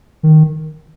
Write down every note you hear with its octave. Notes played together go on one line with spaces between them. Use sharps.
D#3